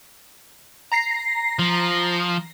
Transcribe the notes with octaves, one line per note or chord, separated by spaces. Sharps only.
A#5 A#6 C7
F3